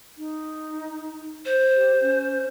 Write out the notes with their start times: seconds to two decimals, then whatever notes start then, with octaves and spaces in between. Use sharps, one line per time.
0.18 D#4
1.45 C5
1.75 G4
2.01 C#4